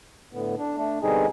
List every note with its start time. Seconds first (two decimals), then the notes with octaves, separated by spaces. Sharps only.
0.33 A2 D3 B3
0.59 D4
0.78 A3 D4
1.02 B2 D3 G3 C4 D#4 G#4